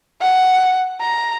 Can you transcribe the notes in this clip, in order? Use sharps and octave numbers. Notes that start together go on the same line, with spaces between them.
F#5
A#5